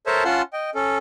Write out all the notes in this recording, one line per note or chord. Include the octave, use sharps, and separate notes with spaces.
A4 A#4 C5 C#5 E5 A5
C#4 F4 F#5 A5 C6
D#5 G5
C#4 A4